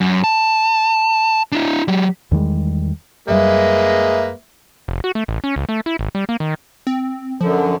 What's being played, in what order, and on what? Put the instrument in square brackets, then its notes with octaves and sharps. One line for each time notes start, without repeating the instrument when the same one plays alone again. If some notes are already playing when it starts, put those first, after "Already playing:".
[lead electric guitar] F#2
A5
D4 E4
F#3 G4
[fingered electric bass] E2 D#3 G3 G#3
[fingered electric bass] F#1 F#2 G3 [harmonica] G#3 A#3 B4 [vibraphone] E5
[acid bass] F1
F#4
A3
A1
C#4
C#2
A3
E4
G#1
G3
A#3
D#3
[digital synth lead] C4
[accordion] F#2 D3 [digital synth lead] F3